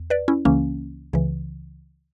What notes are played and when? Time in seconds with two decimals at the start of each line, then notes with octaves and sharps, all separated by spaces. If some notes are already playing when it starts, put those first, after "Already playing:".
Already playing: E2
0.10 B4 D5
0.28 C#4 E4
0.45 C#2 C#3 E3 A#3 C#4
1.13 C#2 C#3 E3